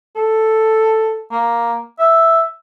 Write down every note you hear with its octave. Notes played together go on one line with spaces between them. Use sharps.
A4
A#3
E5